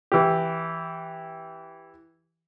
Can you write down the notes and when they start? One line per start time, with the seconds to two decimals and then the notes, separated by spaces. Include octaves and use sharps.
0.12 E3 G4